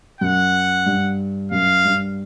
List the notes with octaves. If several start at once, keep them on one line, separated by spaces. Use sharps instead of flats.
F#2 F#5
G2
F#2 F5
G2